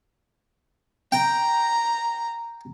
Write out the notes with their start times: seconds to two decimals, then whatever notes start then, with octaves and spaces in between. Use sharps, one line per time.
1.12 G5 A#5